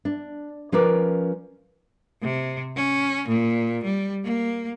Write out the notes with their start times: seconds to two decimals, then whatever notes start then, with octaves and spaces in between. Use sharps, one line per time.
0.05 D4
0.72 F3 C#4 F4 A#4 B4 D5
2.22 C3
2.76 C#4
3.28 A#2
3.84 G3
4.24 A#3